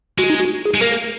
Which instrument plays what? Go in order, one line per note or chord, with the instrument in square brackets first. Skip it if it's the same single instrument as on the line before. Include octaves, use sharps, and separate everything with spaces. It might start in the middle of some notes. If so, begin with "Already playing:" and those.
[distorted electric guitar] G#3 [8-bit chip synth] F#4
[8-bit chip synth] D#4
F#4
G#4
[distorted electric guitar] G#3
[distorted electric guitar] A#3 [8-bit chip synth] A#4